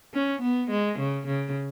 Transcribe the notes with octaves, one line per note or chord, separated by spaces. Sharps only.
C#4
B3
G#3
C#3
C#3